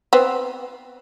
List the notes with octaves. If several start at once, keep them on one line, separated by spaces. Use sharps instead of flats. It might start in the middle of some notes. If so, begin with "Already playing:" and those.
B3 C4